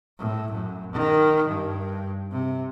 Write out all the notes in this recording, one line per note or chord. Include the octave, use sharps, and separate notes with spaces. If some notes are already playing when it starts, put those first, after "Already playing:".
A2
F#2
D#3
G2
C3